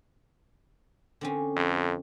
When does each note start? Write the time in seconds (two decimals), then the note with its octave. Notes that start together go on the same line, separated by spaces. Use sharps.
1.21 D3 C4 C#4
1.56 F2